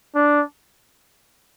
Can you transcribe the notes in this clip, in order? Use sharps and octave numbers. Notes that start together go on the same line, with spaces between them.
D4